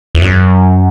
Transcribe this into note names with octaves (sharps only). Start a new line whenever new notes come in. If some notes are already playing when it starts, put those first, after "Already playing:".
E2
F#2